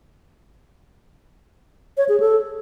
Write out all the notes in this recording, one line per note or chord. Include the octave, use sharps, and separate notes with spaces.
C#5
G#4
A4